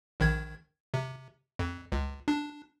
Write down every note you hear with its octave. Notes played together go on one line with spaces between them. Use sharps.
A#1 D#3 G#6
C3
F2
C#2
D4